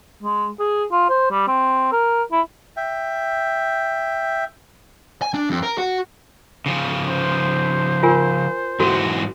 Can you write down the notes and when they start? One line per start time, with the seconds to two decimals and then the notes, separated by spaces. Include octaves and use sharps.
0.23 G#3
0.59 G#4
0.91 F4
1.09 C5
1.31 G3
1.48 C4
1.92 A#4
2.32 E4
2.77 E5 G5
5.22 G#5
5.34 D4
5.50 F2
5.63 A#4
5.78 F#4
6.66 C#3 F3
7.08 C5
8.03 F4 A#4 G#5
8.80 G#2 E3 F#3 F#4 A4